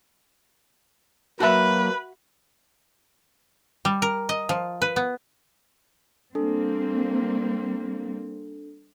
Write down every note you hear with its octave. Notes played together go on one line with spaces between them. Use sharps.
F#3 A#3 F#4 B4 E5
G3
A#4
D#5
F3
B4
B3
G3 A#3 C4 D4 A4